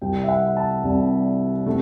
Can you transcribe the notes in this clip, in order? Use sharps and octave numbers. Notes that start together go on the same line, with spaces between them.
C2 C3 G3 G5
E5
F#5
A5
C2 C3 G3
C3 A3